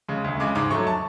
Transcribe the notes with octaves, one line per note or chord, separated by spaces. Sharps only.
C#3 G#3
D2
C#3 G#3 D6
G#2 D6
F#3 A3 C#6
A5